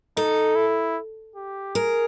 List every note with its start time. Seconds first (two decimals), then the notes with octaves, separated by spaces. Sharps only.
0.17 D#4 A4
0.56 E4
1.36 G4
1.75 G#4 A#4